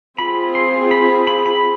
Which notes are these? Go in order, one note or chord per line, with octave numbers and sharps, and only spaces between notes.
C4 F4 G#4 B5
C6
B5
B5
B5